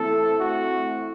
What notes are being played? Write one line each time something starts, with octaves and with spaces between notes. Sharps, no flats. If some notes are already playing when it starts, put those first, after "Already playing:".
Already playing: E3 A3 C4 A4
F#4